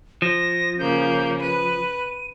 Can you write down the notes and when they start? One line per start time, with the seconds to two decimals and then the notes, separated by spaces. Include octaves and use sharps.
0.22 F3 A#6
0.79 C#3 A#3 G6
1.41 B4 D#7